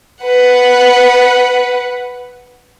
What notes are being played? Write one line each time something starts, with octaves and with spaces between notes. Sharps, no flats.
B4 F#5